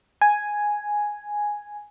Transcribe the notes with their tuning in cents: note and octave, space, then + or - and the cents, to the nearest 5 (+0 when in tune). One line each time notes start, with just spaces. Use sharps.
G#5 +0